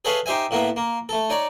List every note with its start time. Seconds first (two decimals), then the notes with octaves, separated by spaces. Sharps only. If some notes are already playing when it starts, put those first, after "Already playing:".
0.05 G#4 A4 B4 C#5 E5 F5
0.26 D#4 G4 C5 E5 G#5
0.51 A2 A#3 B3 E5
0.76 A#3
1.09 A3 A4
1.30 D#4 C#5 D5